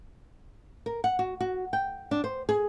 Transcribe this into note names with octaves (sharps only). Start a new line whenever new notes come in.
A#4
F#5
F#4
F#4
G5
D4
C5
G#4